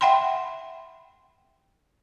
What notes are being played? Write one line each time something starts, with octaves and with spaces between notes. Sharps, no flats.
E5 F#5 G5 B5 C6